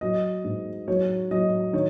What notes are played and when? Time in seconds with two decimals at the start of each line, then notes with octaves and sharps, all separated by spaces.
0.01 F#3 D#5
0.44 G#2
0.88 F#3 C#5
1.31 F#3 D#5
1.73 D#3 C#5